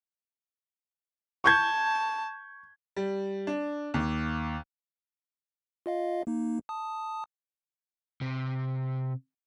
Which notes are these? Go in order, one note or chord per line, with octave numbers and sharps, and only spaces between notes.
A5 C#6 G6 G#6
G3
D4
D#2
F4 D#5 F5
A#3 D#4
A5 D#6
C3